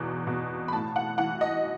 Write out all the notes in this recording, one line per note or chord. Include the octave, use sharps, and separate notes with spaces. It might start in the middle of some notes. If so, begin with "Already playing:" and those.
Already playing: E2 B2
B2
B5
A2 A5
F#5
E3 F#5
D#5